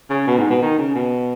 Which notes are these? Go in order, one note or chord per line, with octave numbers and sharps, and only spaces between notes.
C#3
B2
G#2
B2
D#3
C#3
B2